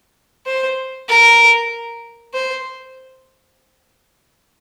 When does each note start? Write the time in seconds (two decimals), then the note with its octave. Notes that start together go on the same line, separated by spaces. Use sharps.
0.46 C5
1.08 A#4
2.34 C5